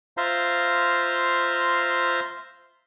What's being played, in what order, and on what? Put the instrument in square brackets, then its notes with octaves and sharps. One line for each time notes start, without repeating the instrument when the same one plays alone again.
[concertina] F4 C5 E5 F5 A#5 C6